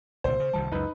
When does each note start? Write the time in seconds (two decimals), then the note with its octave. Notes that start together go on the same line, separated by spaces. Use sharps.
0.24 C2 A#2 D3 C5
0.40 C#3
0.53 C2 D#3 G3 A5
0.72 C#2 F#2 D#4 B4